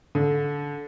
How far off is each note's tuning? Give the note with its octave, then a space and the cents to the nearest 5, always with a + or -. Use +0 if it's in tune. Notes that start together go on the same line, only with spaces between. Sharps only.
D3 -15